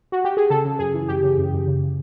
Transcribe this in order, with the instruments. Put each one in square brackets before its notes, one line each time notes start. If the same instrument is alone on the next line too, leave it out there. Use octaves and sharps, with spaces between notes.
[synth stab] F#4
G4
G#4
C#3 A4
C#3
F#2 G#4
E3
F#2 G4
C#3
F#2
F#2
C#3